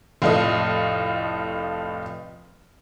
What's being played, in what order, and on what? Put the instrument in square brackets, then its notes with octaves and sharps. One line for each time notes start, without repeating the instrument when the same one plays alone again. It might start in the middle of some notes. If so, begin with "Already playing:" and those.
[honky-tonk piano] F1 A2 F4 A4 D#5